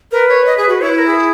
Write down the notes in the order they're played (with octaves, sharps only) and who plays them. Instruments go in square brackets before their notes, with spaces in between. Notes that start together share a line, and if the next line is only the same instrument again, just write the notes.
[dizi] A#4 [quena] B4
[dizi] C#5
D#5
G#4
F#4
[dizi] E4 [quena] C#5
[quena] B4
A#4
G#4